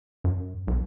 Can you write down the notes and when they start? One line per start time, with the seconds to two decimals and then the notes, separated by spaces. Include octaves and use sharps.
0.24 F#2
0.67 B1